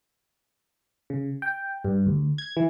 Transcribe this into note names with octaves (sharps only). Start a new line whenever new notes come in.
C#3
G5
G2
D2
G#6
E3